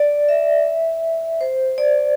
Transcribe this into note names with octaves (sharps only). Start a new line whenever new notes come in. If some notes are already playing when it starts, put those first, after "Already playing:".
Already playing: D5
E5
C5
D5